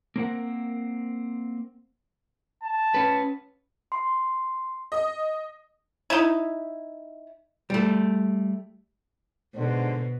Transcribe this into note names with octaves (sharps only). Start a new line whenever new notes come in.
A#3 C4 A#4 F#5
A5
C#4 B4
C6
D#5
D#4 E4
G3 A3
G#2 B2 D3 C5